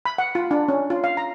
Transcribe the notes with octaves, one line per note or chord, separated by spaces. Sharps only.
B5
F#5
F4
D4
C#4
F4
F5
A#5